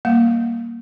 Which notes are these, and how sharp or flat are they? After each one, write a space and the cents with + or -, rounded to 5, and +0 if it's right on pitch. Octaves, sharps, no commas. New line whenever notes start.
G3 +0 A#3 +0 F5 +0